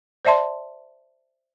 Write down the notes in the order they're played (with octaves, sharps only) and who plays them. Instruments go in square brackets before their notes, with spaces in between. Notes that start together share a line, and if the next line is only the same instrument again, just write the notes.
[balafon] C5 D5 E5 A5 C6